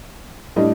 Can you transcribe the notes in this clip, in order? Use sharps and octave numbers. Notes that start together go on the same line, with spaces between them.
A2 G3 D4 D#5